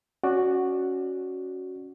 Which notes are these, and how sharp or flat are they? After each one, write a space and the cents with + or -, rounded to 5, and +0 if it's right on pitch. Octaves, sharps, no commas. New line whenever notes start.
C#4 +0 F#4 +0 D5 +20